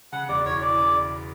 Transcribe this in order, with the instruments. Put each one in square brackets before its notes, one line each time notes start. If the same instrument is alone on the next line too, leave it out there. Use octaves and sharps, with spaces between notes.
[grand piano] C#3 [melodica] F#5
[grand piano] E1 [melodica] D5
[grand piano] E2 [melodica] C#5
[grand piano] E3 [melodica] D5
[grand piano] C#3